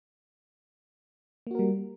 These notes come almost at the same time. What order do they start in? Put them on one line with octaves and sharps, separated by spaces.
A#3 F#4 A#4 G3